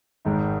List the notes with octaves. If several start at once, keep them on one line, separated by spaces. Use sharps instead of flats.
G#1 G#2 D#3 G#3 D#4